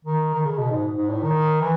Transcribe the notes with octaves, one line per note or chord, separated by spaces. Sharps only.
D#3
D#3
C#3
B2
G#2
G#2
A2
D#3
E3